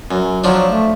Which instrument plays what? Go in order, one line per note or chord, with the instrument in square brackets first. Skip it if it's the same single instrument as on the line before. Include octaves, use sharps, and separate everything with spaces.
[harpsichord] F#2
[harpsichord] F3 D4 [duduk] F#3
[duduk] A3